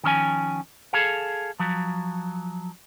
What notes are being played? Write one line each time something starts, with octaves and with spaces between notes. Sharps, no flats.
D#3 F3 C#4 D#5 G#5
G#4 A4 F5
F3 F#3